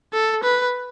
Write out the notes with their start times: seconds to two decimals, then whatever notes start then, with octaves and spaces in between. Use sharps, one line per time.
0.13 A4
0.43 B4